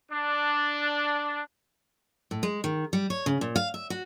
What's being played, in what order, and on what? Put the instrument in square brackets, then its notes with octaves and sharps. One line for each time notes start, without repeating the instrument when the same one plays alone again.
[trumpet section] D4
[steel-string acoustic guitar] A2
G#3
D#3
G3
C#5
C#3
A#2
F5
E5
F#4